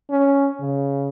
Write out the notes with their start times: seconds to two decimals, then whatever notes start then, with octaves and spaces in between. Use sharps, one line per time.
0.10 C#4
0.60 C#3